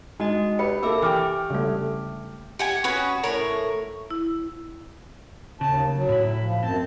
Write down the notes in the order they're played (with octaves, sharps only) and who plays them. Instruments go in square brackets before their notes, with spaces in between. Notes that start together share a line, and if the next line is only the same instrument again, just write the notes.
[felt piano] G#3 [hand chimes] D#4 F#4 D#5
[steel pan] G4 [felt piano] B4 [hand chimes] B5 C#7
[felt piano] A#3 A4 [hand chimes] E5 D6 E6
[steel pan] E3 [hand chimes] G4 [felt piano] G5 D6 F6
[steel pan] C#3 G3 A3
[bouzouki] G4 F#5 G#5
C#4 F#4 G#4 B4
A2 A#4 C#5
[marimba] E4
[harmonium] D#2 A5 [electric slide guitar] C#3
[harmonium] F#3
[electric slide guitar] A2 E4
[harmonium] F3
[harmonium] F#2 A5 [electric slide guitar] C4